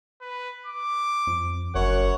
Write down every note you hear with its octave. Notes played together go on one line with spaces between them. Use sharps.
B4
D6
F2
F#1 F#2 C#5 F#5